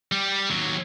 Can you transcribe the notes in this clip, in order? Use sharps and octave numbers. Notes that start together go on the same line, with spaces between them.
G3
D#2 F#3